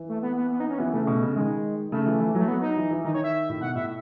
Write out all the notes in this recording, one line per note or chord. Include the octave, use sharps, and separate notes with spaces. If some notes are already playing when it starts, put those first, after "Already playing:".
Already playing: E3
A3
B3
B3
B3
D#4
C#4
E3 B3
C#3 A3
B2
C#3
D#3 G#3
C#3 A3
E3
E3
F#3 A3
B3
D#4
E3
E3
D#3 D#4
C#5
E5
A2
B2 F#5
A2 E5